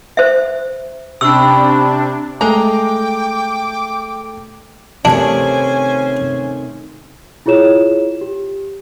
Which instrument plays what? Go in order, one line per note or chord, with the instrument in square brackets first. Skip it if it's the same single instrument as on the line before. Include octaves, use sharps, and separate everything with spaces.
[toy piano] C5 E5
[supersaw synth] C3 D4 [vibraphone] C#4 G5 B5 [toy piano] E6
[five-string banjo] G#3 A#5 [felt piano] A3 [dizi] G5 [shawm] D6
[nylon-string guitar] C3 D#3 A3 [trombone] C#4 [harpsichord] D4 [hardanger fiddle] C5 G#5
[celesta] E4 F4 G#4 C#5 E7
G4